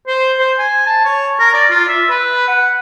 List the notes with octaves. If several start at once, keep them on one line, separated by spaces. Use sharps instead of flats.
C5
C5
G#5
A5
C#5
A#4
D5
F4
E5
B4
F#5